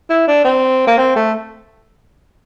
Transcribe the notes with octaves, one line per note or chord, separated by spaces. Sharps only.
E4
D4
C4
A#3
C4
A3